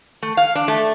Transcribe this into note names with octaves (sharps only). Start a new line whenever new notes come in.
A3
F5
D4
A3